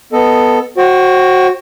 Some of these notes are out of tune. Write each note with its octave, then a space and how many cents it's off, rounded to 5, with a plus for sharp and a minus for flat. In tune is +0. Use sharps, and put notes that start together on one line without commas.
B3 +0 A4 +10 D#5 +0
F#4 +0 C5 +35 G5 -20